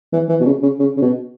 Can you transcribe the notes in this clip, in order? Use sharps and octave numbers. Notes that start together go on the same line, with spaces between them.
E3
E3
B2
C#3
C#3
C#3
C#3
B2